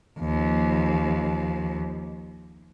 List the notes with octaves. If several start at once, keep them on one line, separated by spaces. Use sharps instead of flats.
D#2 F3